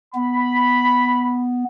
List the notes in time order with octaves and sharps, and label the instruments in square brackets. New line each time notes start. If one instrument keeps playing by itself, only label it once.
[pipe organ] B3 [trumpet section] B5